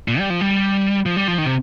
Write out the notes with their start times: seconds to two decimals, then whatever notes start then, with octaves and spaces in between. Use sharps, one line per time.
0.08 A#2
0.19 G3
0.30 F3
0.41 G3
1.06 F3
1.16 G3
1.28 F3
1.38 D#3
1.46 C3